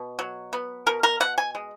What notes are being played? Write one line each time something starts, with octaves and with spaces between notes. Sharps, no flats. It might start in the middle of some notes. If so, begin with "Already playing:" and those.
Already playing: B2
F#3
B3
B2 A#4
A#4
B2 F#5
G#5
G#3